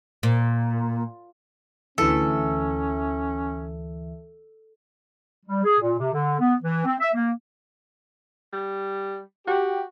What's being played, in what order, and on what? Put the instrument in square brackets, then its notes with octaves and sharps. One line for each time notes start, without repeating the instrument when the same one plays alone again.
[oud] A#2
[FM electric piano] D2 E3 E5 [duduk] C#4 [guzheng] A4
[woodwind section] G3
G#4
A#2
C3
D3
B3
E3
C4
E5
A#3
[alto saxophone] G3
[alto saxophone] F#4 [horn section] G4